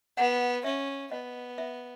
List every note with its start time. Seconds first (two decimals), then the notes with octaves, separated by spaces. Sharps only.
0.17 B3 F#5
0.64 C#4 E5
1.11 B3 D#5
1.58 E5